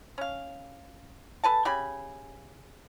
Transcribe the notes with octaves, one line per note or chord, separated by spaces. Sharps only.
C#4 F5
A4 B4 G#5 A5
C#3 G4 G#5 B5